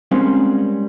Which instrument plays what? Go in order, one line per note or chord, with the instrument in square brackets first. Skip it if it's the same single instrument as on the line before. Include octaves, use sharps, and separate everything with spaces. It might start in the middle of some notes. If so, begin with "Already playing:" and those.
[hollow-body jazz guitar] G3 G#3 A#3 C4 C#4